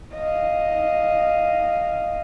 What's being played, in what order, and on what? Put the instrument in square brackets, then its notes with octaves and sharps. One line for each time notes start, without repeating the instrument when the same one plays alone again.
[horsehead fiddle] D#5 F5